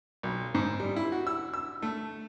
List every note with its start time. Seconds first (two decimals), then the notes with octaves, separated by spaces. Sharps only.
0.23 B1
0.55 G#2
0.80 G3
0.96 E4
1.12 F#4
1.27 E6
1.54 E6
1.82 A3